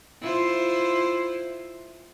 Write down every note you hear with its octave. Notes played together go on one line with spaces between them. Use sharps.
E4 F4 C5